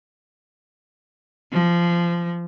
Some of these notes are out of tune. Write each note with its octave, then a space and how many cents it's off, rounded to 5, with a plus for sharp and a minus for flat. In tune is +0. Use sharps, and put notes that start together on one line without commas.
F3 -20